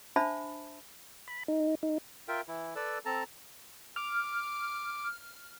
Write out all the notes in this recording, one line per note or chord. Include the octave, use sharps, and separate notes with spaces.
D4 C5 E5 A5 B5
B5
D#4
D#4
F4 A#4 E5 G5
E3 E4
A4 B4 D5 E6
C4 A4 A5 A#5
D6 F6